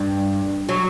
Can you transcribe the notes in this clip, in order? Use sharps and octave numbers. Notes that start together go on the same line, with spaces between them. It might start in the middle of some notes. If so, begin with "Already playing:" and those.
Already playing: G2
F#3